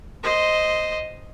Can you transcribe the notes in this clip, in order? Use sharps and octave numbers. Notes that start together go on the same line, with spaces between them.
C5 D#5